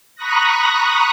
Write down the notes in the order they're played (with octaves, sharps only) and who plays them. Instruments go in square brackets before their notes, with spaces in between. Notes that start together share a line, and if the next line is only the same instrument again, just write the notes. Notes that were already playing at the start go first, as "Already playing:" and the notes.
[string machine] A#5 B5 C#6 D#6 F#6 A#6